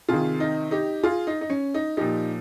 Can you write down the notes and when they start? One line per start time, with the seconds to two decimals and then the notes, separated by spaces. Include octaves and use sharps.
0.08 C3 D#3 F4 G#4
0.40 D#4
0.71 D#4 G4
1.03 F4 G#4
1.27 D#4
1.41 D#4
1.50 C#4
1.74 D#4
1.97 A#2 F3 D#4 G4